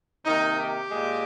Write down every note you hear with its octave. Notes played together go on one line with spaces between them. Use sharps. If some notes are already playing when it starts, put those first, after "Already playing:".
C3 D#3 A#3 D#4
G4
A#2 G#3